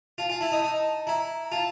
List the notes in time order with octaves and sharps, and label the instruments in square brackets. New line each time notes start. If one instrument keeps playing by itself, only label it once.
[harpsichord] F4 [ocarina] A5
[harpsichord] F4 [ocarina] G#5
[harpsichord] E4 [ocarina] A5
[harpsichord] D#4
D#4
[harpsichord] E4 [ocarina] A#5
[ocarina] A#5
[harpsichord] F4 [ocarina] A5